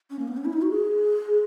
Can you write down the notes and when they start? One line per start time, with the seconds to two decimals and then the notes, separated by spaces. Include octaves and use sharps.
0.11 C#4
0.19 A#3
0.28 B3
0.37 C#4
0.45 E4
0.53 D#4
0.62 F#4
0.71 G#4